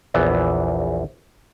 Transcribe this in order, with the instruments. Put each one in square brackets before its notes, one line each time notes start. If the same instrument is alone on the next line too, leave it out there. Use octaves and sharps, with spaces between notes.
[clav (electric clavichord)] A#1 E2 E3 B3